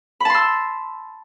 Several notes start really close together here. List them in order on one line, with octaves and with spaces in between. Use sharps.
B5 A5 C6 E6